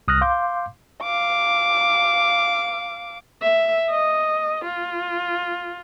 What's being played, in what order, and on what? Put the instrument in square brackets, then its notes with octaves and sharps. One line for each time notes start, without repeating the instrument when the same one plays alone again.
[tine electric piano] C2 D#6 F6 F#6 A#6
F5 C6 D6 G6
[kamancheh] F5 D6
[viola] E5
D#5
F4